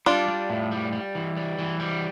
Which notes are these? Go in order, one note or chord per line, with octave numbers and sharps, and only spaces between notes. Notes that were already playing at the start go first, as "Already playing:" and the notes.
G3 D4 F4
G3
A2
G3
G3
E3
G3
E3
G3